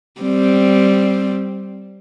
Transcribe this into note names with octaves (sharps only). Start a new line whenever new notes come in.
G3 C4